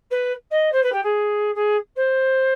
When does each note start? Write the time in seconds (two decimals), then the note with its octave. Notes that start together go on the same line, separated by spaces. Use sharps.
0.10 B4
0.51 D#5
0.72 C5
0.82 B4
0.92 G4
1.03 G#4
1.54 G#4
1.96 C5